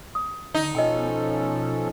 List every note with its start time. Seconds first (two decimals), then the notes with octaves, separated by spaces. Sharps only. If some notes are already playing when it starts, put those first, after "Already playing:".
0.15 D#6
0.54 D3 D#4
0.75 B2 F3 C#4 A4 D#5 G5